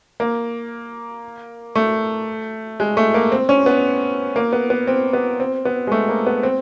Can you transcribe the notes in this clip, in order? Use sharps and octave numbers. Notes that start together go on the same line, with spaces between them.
A#3
A3
G#3
A3
A#3
C4
C#4
B3
A#3
B3
B3
C4
B3
C4
B3
G#3
A3
A#3
B3
C4